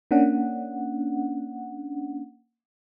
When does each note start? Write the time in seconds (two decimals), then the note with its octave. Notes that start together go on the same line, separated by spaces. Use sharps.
0.11 A#3 C#4 D4 F#5